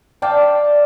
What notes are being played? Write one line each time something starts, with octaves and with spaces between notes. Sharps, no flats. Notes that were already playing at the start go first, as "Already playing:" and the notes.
D5 F5 G5 A5